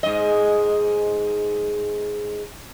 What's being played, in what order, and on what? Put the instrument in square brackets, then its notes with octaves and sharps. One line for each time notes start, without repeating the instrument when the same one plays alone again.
[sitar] G#2 D#5